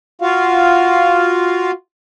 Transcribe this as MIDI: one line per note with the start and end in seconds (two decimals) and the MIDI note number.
0.22 1.71 65
0.22 1.71 66
0.22 1.71 77